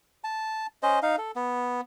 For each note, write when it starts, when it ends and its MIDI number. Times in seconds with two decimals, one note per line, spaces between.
0.24 0.67 81
0.83 0.99 61
0.83 0.99 72
0.83 0.99 75
1.03 1.16 63
1.03 1.16 77
1.18 1.31 69
1.36 1.81 59